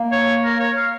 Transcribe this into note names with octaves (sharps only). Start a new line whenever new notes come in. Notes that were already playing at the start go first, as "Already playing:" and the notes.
Already playing: A#3
C#5
A#4
C#5
F5